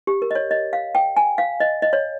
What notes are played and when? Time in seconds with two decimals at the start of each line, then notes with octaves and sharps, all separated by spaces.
0.07 G4
0.22 A#4
0.31 D#5
0.35 C#5
0.51 D#5
0.73 F5
0.95 G5
1.17 G#5
1.38 F5
1.60 D#5
1.82 D#5
1.93 C#5